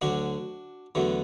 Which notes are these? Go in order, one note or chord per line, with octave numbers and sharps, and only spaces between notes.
D2 D3 F#3 D4 F#4
E2 D3 F#3 A3